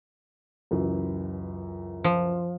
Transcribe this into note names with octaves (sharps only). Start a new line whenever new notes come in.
C#2 F#2 E3
F3